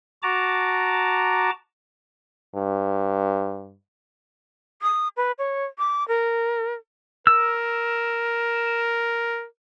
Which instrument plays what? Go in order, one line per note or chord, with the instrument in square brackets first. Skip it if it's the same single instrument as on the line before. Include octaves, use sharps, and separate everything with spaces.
[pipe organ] F#4 A5 A#5 D6
[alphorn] G2
[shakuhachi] D#6
B4
C#5
D6
A#4
[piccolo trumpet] A#4 [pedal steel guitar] E6